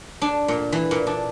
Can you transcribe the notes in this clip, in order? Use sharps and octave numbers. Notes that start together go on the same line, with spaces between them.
D4
A#2
E3
A#2
D4